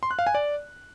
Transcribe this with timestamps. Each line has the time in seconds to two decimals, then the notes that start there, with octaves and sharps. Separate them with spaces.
0.03 C6
0.11 F#6
0.19 F5
0.27 G#5
0.35 D5